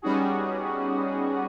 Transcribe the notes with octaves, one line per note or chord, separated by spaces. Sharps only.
G3 B3 C#4 D#4 F#4 G#4